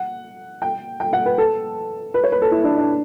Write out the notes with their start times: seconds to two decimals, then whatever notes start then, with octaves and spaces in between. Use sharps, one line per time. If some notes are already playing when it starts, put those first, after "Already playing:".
Already playing: F#5
0.62 G5
1.00 G5
1.13 F#5
1.26 B4
1.38 A4
2.14 B4
2.24 C#5
2.32 B4
2.42 A4
2.51 E4
2.64 D4
2.78 D4